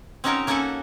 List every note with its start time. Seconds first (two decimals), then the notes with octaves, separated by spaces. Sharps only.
0.24 C4 C#4 D#4 F#4 A#4 C#5
0.47 A#3 C#4 F#4 A4 F#5 G#5